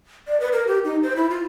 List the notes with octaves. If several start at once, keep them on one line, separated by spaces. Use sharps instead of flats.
D5
B4
A#4
G4
D#4
C5
E4
F4